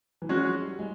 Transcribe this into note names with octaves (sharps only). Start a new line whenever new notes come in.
E3
F3 G#3 C#4 F#4
F#3
G3
G#3